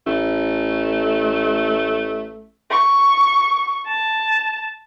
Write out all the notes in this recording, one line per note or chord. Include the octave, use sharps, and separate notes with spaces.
A1 A3
C#6
A5